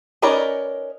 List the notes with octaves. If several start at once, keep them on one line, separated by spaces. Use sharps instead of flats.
C#4 D#4 A#4 B4 D5